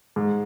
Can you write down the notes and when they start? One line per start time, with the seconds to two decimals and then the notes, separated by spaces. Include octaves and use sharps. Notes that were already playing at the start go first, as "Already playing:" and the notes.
0.16 G#2